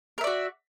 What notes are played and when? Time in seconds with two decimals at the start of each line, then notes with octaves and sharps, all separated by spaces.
0.18 A#4
0.21 E5
0.24 D5
0.27 F#4